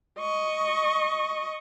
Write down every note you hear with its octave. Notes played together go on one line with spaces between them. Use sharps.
D#5 C#6